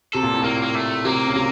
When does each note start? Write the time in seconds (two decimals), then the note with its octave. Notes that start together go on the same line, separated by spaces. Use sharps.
0.13 C3 A4
0.23 A#2
0.32 A2
0.42 A#2 A#3
0.63 A#3
0.75 A3
1.05 C3 A#3
1.27 C#3
1.35 C3 A#3